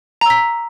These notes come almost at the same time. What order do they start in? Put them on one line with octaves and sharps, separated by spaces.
A#5 E6 B6